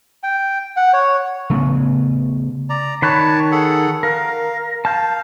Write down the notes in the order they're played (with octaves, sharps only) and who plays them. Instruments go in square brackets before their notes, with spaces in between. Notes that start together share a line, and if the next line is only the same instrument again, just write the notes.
[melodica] G5
F#5
C#5
[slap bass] C#3 A3 B3
[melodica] D5 A#5
[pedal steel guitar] D#3 B5 F#6 [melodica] C#5 A5
[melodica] G#4 A4 F#5
[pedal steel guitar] A#4 [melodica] F5
[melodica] F5 [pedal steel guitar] A5 G6